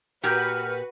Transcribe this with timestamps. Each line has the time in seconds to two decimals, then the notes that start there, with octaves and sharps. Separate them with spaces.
0.24 A#2 F#4 G4 A#4 B4 F6 G6